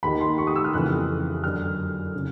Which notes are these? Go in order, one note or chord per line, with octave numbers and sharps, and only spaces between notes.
D#2 D#3 B5
C6
C#6
D#6
E6
F6
F2 C#3 E3 F#6
F#2 D3 F6
C#3